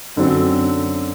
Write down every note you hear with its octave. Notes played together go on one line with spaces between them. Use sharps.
F#2 D3 F#3 C4